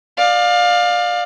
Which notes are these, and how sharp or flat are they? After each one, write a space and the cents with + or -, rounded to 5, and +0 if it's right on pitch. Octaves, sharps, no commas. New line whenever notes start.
D5 +20 F5 +20